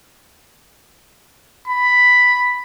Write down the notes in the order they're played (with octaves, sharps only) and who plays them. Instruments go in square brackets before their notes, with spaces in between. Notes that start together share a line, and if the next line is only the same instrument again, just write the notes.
[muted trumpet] B5